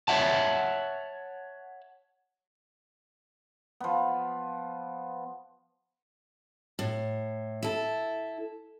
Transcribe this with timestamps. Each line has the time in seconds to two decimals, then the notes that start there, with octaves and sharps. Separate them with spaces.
0.08 C#5 D#5 E5 F#5 A5
3.80 F3 B3
6.79 A2
7.63 E4 A4